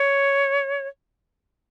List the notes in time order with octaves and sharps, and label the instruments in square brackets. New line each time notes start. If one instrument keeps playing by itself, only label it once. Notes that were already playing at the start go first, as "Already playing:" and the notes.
Already playing: [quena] C#5